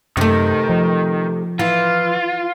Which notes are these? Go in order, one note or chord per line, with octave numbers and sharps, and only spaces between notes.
F#2 C3 D#3 A3
F3
E3 F4